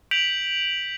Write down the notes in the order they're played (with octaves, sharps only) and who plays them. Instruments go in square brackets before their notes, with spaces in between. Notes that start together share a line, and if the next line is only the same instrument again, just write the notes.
[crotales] G6 B6 D7 F7 F#7